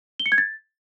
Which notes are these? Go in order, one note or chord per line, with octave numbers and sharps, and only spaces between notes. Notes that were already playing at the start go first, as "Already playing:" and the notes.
G7
C#7
G#6
A6